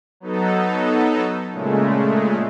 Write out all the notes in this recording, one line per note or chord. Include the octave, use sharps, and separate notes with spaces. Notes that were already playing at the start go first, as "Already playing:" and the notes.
F#3 B3 D#4 A4
A#2 C#3 G#3 A3